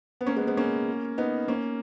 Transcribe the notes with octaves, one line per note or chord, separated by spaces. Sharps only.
B3
A#3 C#4
G#3 B3
G#3 B3
A#3 C#4
B3 D#4
A#3 C#4